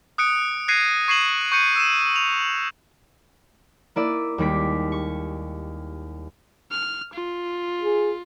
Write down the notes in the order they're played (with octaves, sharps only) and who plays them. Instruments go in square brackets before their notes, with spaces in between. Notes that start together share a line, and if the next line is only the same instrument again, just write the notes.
[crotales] D#6 F#6 C#7 D7
F#6 G#6 A#6 C7 C#7 D#7
C#6 G#6 C7 D#7 E7 F#7
C#6 G6 C#7 D#7
E6 D#7 E7
F7
[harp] A#3 E4 D5 E5 D#7
D#2 G3 G#3 D6 B6
C#6
[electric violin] F6
F4
[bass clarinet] G#4